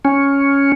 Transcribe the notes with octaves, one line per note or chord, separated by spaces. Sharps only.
C#4